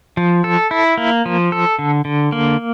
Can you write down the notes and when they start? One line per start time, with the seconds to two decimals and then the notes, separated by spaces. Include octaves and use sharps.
0.17 F3
0.44 A4
0.71 E4
0.98 A#3
1.26 F3
1.52 A4
1.79 D3
2.05 D3
2.32 A#3